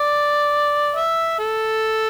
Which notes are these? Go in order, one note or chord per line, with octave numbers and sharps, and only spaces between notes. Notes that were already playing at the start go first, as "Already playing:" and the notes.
Already playing: D5
E5
A4